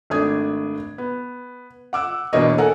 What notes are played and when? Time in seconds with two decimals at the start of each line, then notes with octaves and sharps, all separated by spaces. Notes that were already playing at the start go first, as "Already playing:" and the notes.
0.10 G#1 A3 D4 D#6 G#6
0.98 B3
1.93 F#5 D6 E6
2.33 E2 B2 A#3 D4 C#5 D#5
2.58 A4 A#4 F#5 G#5